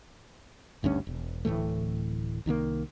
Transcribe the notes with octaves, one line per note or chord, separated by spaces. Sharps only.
G#1 D2 G2 C#4
E1
D1 A2 E3 A3
C2 D#3 F3 A#3